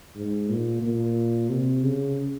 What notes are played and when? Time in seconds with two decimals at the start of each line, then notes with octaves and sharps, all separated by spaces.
0.16 G#2
0.49 A#2
0.82 A#2
1.49 C3
1.83 C#3